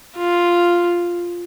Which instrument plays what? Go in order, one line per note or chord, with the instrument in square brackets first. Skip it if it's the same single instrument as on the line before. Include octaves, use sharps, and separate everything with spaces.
[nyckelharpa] F4